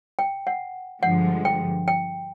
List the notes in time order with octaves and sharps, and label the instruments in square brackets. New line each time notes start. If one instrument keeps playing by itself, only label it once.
[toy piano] G5
F#5
[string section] G2 D3 F3 G#3 [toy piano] F#5
[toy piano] G5
G5